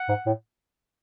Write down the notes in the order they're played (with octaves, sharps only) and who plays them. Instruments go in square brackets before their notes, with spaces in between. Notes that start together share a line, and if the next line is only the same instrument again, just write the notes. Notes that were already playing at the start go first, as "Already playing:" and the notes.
Already playing: [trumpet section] F#5
[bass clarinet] G#2
A2